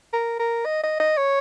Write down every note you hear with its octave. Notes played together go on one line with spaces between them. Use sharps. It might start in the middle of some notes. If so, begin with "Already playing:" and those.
A#4
A#4
D#5
D#5
D#5
C#5